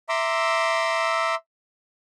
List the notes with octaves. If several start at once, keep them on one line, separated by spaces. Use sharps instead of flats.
E5 A#5 C6 D6 E6